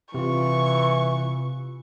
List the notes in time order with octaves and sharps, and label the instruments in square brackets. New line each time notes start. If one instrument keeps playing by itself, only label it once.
[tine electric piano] C3 F4 [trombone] E3 [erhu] C#6